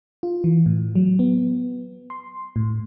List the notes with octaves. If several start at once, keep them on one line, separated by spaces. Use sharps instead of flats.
F4
E3
A2
F#3
B3
C6
A2